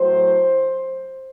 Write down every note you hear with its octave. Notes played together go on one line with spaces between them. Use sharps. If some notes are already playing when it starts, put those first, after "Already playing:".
Already playing: A2 F#3 C5